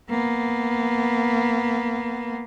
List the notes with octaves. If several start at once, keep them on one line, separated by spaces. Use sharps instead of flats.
A#3 B3